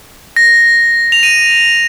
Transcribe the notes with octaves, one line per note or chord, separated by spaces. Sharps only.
A#6
F7
D#7